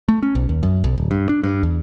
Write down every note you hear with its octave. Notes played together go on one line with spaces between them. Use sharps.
A3
C#4
B1
D#2
F#2
B1
D1
G2
D4
G2
E2